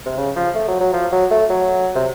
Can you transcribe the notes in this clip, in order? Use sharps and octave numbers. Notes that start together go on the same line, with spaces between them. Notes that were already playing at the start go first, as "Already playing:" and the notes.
C3
C#3
F3
A3
F#3
F#3
F3
F#3
A3
F#3
C3